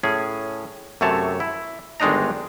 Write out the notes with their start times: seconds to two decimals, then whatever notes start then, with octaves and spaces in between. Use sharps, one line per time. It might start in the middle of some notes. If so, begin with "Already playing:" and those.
0.03 A2 C#4 G#4
1.01 F#2 C3 A3 C#5 A5
1.40 E4
2.00 G1 D#3 G#3 D4 D#4 A#5